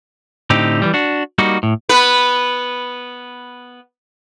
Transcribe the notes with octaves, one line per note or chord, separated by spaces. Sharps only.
A2 D3 C4 D#4 G4
E3 F3 G3
D4 F#4
G3 A#3 D#4 F#4
A2
B3 B4